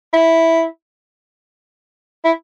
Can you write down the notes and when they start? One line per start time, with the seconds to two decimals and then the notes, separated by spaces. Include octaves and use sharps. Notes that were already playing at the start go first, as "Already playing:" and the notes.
0.13 E4
2.25 E4